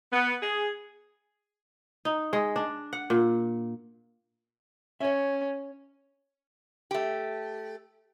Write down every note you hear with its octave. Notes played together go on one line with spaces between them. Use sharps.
B3
G#4
D#4
G#3
D4
F#5
A#2
C#4 C#5 E5
A3 G4